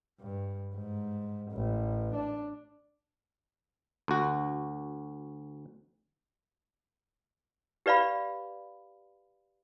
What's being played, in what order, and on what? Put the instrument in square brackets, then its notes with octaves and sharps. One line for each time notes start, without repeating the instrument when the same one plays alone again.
[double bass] G2
G#2
A1
D4
[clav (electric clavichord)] D2 F#4
[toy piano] G4 B4 D5 F5 B5